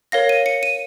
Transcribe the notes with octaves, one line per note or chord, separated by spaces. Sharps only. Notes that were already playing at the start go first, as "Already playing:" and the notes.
A#4 C#5 F5 A#6
D#7
C#7
D#7